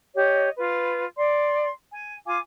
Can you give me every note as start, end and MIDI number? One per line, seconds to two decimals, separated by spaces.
0.15 0.49 67
0.15 0.49 73
0.15 0.49 75
0.57 1.05 65
0.57 1.05 71
1.16 1.68 74
1.16 1.68 84
1.91 2.12 80
2.26 2.38 65
2.26 2.38 77
2.26 2.38 80
2.26 2.38 86